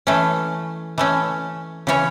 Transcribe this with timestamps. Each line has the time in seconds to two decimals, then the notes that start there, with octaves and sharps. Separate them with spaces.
0.07 E3 A3 C#4
0.98 E3 A3 C#4
1.87 C#3 E3 C#4 C#5